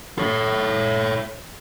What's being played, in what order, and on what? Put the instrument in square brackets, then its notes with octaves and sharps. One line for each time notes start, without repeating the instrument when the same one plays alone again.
[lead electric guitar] A4 C#5